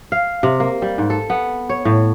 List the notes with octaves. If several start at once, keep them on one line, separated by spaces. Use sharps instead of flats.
F5
C3
A#3
G3
G#2
A4
B3
C#5
A2